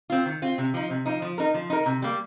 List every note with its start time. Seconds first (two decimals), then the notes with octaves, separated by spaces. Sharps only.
0.10 C4 F4
0.26 D#3
0.42 C4 F4
0.58 C3
0.74 F3 D#4
0.90 C3
1.06 F3 D#4
1.22 F3
1.38 D#4 A#4
1.54 F3
1.70 D#4 A#4
1.86 C3
2.02 G3 A#3